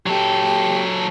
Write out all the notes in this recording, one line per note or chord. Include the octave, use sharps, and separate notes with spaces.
F#3 G4 A4